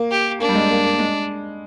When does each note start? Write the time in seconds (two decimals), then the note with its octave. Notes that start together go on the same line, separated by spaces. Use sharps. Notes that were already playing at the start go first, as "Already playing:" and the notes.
Already playing: A#3
0.11 G4
0.40 A#3 D4
0.49 G3
0.55 G#3
0.69 A#3
0.85 A#3
0.99 G#3